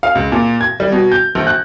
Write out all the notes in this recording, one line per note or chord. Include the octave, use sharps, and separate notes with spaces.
F5
C#2
A#2
G#6
G3
B2
G6
A#1
F#6